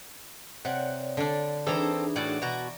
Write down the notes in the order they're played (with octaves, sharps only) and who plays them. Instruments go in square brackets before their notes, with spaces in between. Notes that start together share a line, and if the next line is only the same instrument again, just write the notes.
[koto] C3 [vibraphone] C#5 D5 [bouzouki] F#5
[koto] D3 D4
[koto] E3 A#5 [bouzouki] C4 A4 [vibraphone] D4 D#4 G#4
[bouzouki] A2 E3 F#4 [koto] D5
[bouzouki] B2 F#4 [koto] A#5